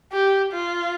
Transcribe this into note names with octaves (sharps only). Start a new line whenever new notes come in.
G4
F4